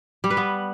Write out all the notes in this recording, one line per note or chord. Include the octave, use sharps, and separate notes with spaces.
G3
B4
B3